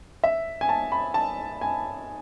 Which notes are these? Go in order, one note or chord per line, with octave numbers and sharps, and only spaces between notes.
E5
G#5
A5
B5
A5
G#5